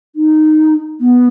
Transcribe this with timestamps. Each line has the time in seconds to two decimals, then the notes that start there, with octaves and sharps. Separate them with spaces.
0.16 D#4
1.01 B3